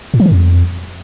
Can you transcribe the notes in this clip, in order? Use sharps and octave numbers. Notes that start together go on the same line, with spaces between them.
A2
F3
D#3
F2